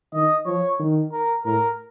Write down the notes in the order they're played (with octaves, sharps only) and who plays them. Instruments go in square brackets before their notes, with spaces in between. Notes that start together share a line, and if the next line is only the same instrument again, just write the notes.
[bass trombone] D#3 [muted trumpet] D#5
[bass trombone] F3 [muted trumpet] C#5
[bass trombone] D#3
[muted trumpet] A#4
[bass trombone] A2 [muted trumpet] A#4